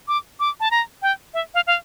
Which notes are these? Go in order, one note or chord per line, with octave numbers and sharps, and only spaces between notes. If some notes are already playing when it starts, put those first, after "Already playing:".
D6
D6
A5
A#5
G5
E5
F5
F5